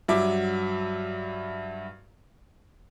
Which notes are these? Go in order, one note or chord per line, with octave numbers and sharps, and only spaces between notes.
G2 F#3 E5 D6